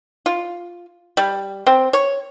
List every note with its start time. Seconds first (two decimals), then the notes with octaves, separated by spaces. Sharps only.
0.26 F4
1.17 G3
1.67 C4
1.93 C#5